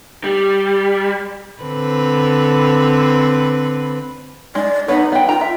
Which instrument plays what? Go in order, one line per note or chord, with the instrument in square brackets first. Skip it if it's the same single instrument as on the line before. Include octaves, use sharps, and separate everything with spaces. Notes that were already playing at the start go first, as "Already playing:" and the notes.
[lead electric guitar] G3
[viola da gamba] D3 C4 B4
[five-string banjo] G#3 D#4 [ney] D5
[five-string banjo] B3 B4 C#5 [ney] D#4
[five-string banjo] B3 G5
[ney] F4 [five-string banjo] G5 A#5
[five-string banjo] E5